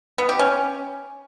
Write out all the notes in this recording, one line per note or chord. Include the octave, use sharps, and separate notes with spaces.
B3
G4
C#4